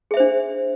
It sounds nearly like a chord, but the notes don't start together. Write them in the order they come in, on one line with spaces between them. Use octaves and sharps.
G#4 E5 C5 D4